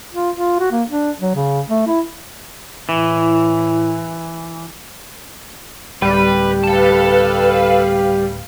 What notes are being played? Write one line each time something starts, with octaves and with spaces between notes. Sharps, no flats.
F4
F4
F#4
A#3
D4
F#3
C#3
A3
E4
A2 E3
D1 G3 B4
A4 B4 F5 A5